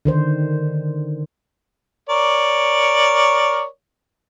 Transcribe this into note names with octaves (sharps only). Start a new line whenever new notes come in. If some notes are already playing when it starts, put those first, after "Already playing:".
D3 D#3 C5
A#4 C#5 D5